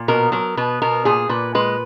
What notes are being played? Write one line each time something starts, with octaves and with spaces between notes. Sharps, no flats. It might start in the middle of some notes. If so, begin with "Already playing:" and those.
Already playing: A#2
B2 A#4
F#3 A#4
B2 B4
B2 A#4
A#2 G#4
A#2 B4
G#3 B4